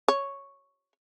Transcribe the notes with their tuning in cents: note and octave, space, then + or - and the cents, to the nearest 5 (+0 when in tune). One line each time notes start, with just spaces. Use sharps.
C#5 +0